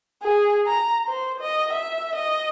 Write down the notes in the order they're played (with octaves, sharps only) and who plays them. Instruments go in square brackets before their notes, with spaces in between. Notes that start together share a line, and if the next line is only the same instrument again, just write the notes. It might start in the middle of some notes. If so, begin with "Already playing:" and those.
[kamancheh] G#4
A#5
C5
D#5
E5
D#5